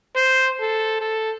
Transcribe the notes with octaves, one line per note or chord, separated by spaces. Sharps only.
C5
A4
A4